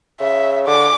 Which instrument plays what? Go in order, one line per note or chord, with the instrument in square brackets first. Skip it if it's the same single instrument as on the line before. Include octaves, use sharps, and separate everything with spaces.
[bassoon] C#3 [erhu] E5
[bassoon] D3 [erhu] D6